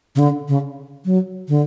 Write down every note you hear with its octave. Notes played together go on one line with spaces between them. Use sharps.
C#3
D3
C#3
F#3
D3